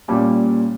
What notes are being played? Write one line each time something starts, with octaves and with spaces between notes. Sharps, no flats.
A#2 G3 C#4